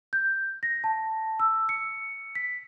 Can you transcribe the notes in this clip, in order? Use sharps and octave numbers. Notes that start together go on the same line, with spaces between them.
G6
A#6
A5
E6
C#7
B6